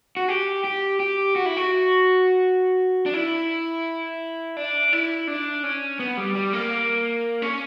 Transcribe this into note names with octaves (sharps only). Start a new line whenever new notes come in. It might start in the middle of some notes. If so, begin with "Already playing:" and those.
F#4
G4
G4
G4
F#4
E4
F#4
D4
E4
D4
E4
D4
C#4
B3
G3
G3
A#3
C#4